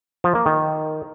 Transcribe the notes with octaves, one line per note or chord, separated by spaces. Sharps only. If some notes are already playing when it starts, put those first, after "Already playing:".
F3
A#3
D#3